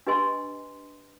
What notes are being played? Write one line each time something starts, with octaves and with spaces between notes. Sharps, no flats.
D4 G4 B4 D#5 G#5 C6